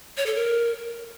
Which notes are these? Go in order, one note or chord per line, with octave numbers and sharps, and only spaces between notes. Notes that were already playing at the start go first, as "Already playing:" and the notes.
C#5
A4
A#4